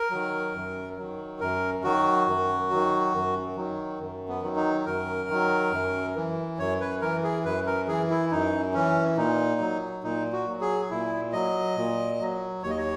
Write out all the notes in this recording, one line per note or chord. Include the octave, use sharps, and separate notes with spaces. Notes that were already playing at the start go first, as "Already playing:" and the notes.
Already playing: A#4
D#3 F#3
F#2
D#3 F#3
F#2 A#4
D#3 F#3 F#4
F#2
D#3 F#3
F#2
D#3 F#3
F#2
B3
D#3 F#3
D#4
F#2 A#4
D#3 F#3
F#2
E3
F#2 C#5
B4
E3 A#4
G#4
F#2 B4
A#4
E3 G#4
E4
F#2 D#4
E3 C#4
A#2 D#4
F#3
A#2 D#4
F#4
F#3
G#4
A#2 E4
F#3 D#5
A#2
F#3
D#2 C#5
D#5
C#5